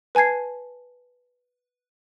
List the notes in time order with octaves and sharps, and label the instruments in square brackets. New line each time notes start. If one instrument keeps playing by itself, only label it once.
[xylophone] B4 G#5 A5 G#6 C7